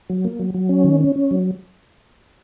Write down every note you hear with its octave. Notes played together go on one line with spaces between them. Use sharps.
F#3
A#3
F#3
F#3
C#4
D#3
C#4
C#4
F#3